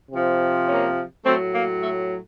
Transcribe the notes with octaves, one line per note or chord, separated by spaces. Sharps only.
C3 F3
A#3 C#4
A2 F#3 A3 C4
A#3
A3